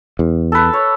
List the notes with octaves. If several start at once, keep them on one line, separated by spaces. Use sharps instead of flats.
E2
A4 B4
C#5